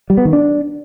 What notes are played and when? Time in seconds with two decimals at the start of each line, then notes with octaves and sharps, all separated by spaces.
0.10 G3
0.17 B3
0.25 D#3
0.33 D4